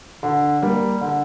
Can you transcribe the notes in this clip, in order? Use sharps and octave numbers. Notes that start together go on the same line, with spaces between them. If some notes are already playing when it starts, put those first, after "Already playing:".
D3
G3 A#3
D3